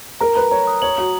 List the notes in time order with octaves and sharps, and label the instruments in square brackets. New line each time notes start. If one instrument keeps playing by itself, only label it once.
[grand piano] A#4 [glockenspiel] A#5
[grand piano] B4 [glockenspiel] A#5
[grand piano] C#5 [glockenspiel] A#5
[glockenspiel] D#6
[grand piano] C#5 [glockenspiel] F#7
[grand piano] F#4 [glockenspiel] F#7